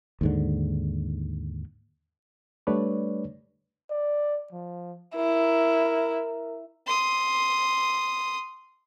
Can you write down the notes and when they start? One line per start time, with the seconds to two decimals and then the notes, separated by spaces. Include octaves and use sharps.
0.21 D#2 G#2 D3
2.67 G3 A3 D4 B4 C#5 D5
3.90 D5
4.52 F3
5.16 E4 A#4
6.87 C6 D#6